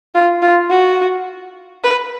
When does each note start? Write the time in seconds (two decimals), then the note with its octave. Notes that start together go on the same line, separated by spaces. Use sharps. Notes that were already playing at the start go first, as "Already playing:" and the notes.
0.15 F4
0.42 F4
0.70 F#4
1.84 B4